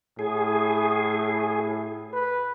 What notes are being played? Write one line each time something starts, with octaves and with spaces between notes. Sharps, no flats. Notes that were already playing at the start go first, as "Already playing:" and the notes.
A2 G#4
B4